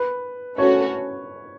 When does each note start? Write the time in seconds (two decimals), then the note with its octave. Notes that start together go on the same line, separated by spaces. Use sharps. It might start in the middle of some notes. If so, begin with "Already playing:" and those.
Already playing: B4
0.58 A3 C#4 F#4 C#5